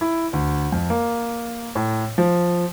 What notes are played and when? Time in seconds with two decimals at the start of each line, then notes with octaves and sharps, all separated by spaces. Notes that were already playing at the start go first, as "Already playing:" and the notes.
0.01 E4
0.33 D2
0.72 F2
0.90 A#3
1.75 A2
2.18 F3